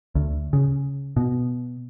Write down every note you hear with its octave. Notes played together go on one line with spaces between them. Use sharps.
D2
C#3
B2